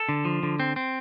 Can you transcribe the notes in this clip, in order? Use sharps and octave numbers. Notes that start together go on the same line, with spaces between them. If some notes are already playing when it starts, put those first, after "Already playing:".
Already playing: A4
D3
F3
D3
C4
C4